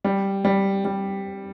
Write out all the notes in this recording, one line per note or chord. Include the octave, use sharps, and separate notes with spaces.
G3
G3
G3